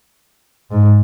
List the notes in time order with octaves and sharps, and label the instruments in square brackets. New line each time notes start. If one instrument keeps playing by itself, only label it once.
[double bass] G#2